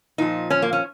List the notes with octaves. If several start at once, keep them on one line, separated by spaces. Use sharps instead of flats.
A#2 F3 D#4
C#4
A#3
C#4